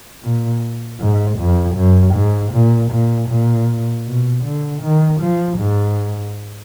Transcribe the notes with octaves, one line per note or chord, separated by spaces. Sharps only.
A#2
G#2
F2
F#2
G#2
A#2
A#2
A#2
B2
D3
D#3
F3
G#2